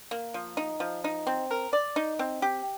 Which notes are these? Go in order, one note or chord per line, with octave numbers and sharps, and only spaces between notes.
A#3
F3
D#4
F3
D#4
C4
A#4
D5
D#4
C4
G4